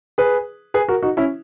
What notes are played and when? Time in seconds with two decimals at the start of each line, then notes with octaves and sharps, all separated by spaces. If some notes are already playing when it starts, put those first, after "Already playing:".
0.18 G#4 B4
0.74 G#4 B4
0.88 F#4 A#4
1.03 D#4 F#4
1.17 C#4 E4